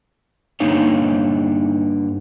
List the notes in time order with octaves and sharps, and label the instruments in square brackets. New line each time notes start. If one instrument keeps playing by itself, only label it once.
[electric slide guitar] G2 D3 A#3 D#4 C#5 F5